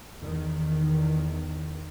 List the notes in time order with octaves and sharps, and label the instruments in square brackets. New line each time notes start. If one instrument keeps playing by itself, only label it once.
[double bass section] E2 D#3